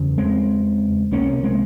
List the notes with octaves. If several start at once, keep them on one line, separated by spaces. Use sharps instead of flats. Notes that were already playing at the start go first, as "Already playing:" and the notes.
Already playing: E2 C#3
G#3 C4
C2 C3 A#3 C#4
G#3 C4